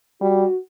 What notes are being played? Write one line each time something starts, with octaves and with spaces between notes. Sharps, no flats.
G3 F#4